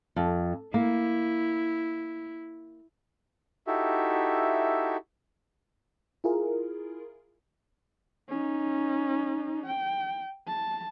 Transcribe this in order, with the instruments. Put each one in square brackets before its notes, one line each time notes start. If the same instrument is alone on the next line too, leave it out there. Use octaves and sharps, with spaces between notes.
[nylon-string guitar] F2
[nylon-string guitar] A#3 [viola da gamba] E4
[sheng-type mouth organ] D#4 E4 F#4 G4 A4 E5
[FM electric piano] E4 F4 G#4 A#4
[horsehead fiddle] C#4 D#4
G5
A5